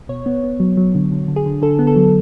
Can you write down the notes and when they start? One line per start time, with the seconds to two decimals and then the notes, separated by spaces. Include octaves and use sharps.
0.09 B2 C#5
0.26 B3
0.44 B3
0.60 F#3
0.77 F#3
0.95 D3
1.11 D3
1.28 D3
1.36 G#4
1.46 D3
1.62 D3 A4
1.79 B3
1.87 A4
1.96 F#3